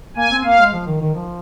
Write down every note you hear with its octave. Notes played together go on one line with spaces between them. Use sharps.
A#3 G#5
C4
A#3 F5
G#3
F3
D#3
D#3
F3